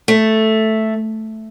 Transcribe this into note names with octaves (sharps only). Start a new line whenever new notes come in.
A3